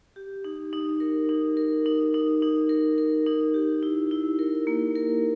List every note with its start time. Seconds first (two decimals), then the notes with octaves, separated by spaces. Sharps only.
0.16 G4
0.44 D#4
0.73 D#4
1.00 A#4
1.29 D#4
1.57 A#4
1.86 D#4
2.14 D#4
2.42 D#4
2.69 A#4
2.98 A#4
3.27 D#4
3.54 G4
3.83 E4
4.11 E4
4.39 A#4
4.67 A#3
4.95 A#4